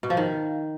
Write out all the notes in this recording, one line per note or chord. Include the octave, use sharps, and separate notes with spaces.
B2
F3
D#3